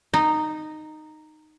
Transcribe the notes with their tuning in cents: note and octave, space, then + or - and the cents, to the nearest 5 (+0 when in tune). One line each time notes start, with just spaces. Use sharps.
D#4 -10